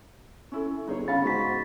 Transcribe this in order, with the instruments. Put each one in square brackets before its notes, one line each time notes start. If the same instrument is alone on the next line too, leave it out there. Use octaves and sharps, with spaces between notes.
[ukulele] C#4 E4 A4
[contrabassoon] G1 [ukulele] D#4 G#4 C#5
[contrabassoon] C#3 [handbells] B3 B5 A6 [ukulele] F5 F#5
[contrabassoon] G#2 [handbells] F#4 B6 [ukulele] G#4 C5